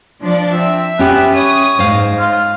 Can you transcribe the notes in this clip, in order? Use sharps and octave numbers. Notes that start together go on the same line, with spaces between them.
F3 D4 D5
C4 E5
B3 C#4 G4
C#5 D#6
G#2 C5 F5
F4